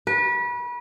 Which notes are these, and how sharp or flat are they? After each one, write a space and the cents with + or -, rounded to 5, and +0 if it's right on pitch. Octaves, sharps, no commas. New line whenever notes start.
B4 -30